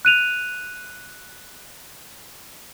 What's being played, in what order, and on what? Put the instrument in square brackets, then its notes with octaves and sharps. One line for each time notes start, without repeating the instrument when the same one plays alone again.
[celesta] F#6 D#7 F7